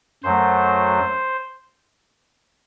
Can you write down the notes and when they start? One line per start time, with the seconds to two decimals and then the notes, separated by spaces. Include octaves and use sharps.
0.24 F#2 F#3 A3 C5